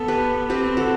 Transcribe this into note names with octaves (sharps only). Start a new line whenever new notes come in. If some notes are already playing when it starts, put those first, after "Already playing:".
Already playing: B3 A4
G4 B4
C4 G4 B4
F#4 A4